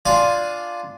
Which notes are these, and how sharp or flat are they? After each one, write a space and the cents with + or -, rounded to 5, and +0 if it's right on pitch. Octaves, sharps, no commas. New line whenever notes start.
D4 +0 F4 +0 G#5 +0